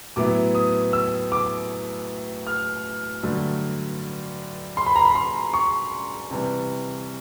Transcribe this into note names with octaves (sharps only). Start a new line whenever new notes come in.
A2 F#3 B3 E4 D6
D#6
E6
D6
F6
G2 D3 F#3 A3
C6
B5
A#5
B5
C6
C#6
C3 E3 G3